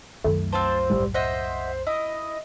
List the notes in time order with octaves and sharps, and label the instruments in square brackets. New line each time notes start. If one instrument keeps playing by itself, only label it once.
[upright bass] C2 F#2 [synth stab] D#3 A3
[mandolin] C4 F4 C5 [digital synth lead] A5
[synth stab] G#1 A2 [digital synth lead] G3
[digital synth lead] C5 [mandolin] D#5 E5 F#5
[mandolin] E4 [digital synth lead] D#5